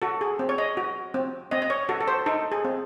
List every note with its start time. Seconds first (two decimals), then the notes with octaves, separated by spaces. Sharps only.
0.02 F#4 A4
0.21 G#4
0.39 C4
0.49 C#5
0.58 D#5
0.77 F#4
1.14 C4
1.51 C4 D#5
1.62 D#5
1.70 C#5
1.89 F#4 A4
2.01 A4
2.08 C5
2.26 D#4 A4
2.52 G#4
2.65 C4